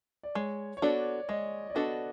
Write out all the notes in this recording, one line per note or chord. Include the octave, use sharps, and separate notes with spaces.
D5
G#3 C#5
C#5
B3 D4 F#4 A4 D5
G#3 D#5
D5
B3 D4 F#4 A4 D#5